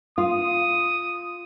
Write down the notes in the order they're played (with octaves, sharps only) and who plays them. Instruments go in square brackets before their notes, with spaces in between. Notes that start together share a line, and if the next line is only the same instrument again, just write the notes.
[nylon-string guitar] F4 [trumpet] D#6